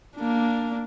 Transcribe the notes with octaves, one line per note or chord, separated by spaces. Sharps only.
A#3 D4